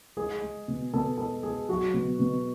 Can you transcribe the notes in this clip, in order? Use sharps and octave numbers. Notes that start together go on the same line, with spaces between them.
G#3 G#4
G#3
B2
B2 A4
G#3 A4
G#3 G#4
F#3 F#4
B2
B2